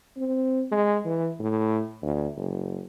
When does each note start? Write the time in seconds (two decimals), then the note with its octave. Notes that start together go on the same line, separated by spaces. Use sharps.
0.17 C4
0.72 G#3
1.06 E3
1.39 A2
2.03 D2
2.37 F#1